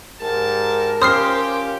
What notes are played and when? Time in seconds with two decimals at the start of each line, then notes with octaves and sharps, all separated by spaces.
0.20 G#2 G4 A#4 A5
1.02 C#4 F4 G4 C5 D#6 F6 C7